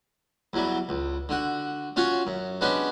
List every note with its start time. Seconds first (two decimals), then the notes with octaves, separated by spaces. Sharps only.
0.53 E2 F#3 G3
0.89 C#2
1.29 D3 F#4
1.96 C#4 F4 F#4 C#5
2.27 F#2
2.61 G#3 B3 C#4 D4 F#4 G4